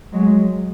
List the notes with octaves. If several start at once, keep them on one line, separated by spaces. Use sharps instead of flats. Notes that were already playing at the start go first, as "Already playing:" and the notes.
F#3 G#3